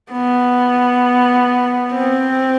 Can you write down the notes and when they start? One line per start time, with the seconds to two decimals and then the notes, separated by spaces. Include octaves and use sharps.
0.12 B3
1.94 C4